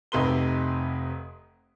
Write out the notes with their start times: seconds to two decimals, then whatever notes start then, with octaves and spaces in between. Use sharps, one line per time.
0.12 F1 C3 D#4 B4 C6 G7